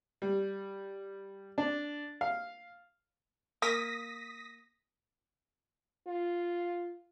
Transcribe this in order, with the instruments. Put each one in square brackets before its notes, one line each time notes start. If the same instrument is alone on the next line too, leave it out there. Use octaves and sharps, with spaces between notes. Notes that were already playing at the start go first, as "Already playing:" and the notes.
[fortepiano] G3
D4
F5
[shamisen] A#3 [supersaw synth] D#6 A#6 B6
[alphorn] F4